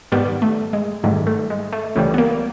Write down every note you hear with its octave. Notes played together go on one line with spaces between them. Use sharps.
G#2 D#3 G3 B3
A3
G#3
G#2 D#3 G3 A3
A3
G#3
A3
C#2 C#3 E3 G3 A3
B3
A#3